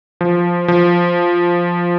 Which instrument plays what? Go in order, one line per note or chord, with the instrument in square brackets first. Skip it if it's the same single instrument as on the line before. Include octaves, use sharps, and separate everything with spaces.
[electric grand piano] F3
F3